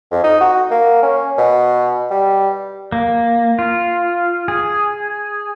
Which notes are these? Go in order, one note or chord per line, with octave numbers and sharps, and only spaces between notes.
F2
D#4
F#4
A#3
C#4
B2
G3
A#3
F4
G#4